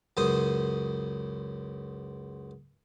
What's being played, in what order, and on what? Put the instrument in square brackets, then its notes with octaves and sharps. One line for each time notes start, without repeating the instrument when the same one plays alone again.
[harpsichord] C#2 F#2 C5 D#6